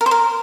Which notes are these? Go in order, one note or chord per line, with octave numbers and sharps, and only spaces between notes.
A#4
C5
A#4